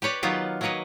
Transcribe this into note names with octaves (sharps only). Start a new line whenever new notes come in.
G4 B4 C#5 D5
D#3 F#3 B3 F4 G4
F#3 A#3 A#4 B4 C#5 D#5